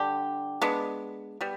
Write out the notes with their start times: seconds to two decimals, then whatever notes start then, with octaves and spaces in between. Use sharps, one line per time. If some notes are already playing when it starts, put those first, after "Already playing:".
Already playing: D3 G3 D4 G4
0.62 G#3 B3 D4
1.41 G3 B3